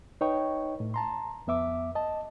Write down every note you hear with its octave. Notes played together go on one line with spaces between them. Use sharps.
D#4 B4 C#5 D#5 G5 C#6
A2
A5 A#5 C6
F2 B3 E5 D6
D#5 A5